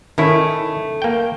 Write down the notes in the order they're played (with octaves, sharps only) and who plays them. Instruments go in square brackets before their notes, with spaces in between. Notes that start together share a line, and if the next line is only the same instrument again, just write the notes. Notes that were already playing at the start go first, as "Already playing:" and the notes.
[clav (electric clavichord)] D#3 C#4 E4 [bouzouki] A3
[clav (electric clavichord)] A#3 G5